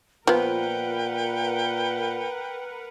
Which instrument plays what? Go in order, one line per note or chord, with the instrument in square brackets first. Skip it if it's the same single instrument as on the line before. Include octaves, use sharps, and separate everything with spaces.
[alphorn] A#2 [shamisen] F3 B3 [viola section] A#4 B4 F#5 [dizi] G5